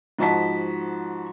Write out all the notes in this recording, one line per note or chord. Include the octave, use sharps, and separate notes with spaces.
G#2 F3 F#4 D#5 A5 B6